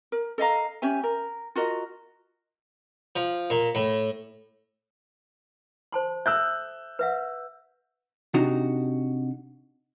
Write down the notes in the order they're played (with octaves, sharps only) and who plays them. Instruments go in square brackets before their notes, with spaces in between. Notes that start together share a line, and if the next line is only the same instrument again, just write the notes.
[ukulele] A#4
A4 D#5 F5 A#5
C#4 G4 E5 G#5
A#4
F4 F#4 A#4 D#5
[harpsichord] F3
A#2
A2
[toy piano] C5 A5 C6
[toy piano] A4 E5 [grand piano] E6 F#6 G6
[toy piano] B4 E5 F#5
[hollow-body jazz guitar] C3 D4 D#4 F#4